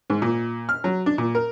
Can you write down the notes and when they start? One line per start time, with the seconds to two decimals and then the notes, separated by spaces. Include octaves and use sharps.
0.10 G#2
0.22 A#2
0.69 F6
0.84 F#3
1.06 D4
1.18 A#2
1.35 A#4